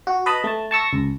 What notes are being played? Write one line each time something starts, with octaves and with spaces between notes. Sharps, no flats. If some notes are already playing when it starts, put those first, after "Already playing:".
F#4
B4 D#5 A5 B5
A3 A5
A5 C#6 E6 A#6
C#2